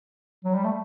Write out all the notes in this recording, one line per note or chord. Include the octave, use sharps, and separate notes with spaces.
F#3
G3
A3